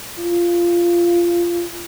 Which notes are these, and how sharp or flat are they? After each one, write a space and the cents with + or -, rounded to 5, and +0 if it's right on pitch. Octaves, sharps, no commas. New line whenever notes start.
F4 -15